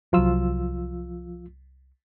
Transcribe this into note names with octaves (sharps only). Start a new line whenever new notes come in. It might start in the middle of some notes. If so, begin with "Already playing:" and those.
C2 F3 F#3 F4 E6